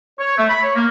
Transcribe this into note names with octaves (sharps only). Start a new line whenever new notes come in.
C#5
A3
B5
C#5
A#3